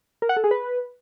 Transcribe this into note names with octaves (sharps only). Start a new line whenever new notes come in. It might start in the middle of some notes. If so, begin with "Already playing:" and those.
A#4
F#5
A4
G#4
B4